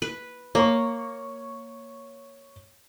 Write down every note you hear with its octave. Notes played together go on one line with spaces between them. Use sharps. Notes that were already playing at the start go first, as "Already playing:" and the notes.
B4
A#3 C#5 C#6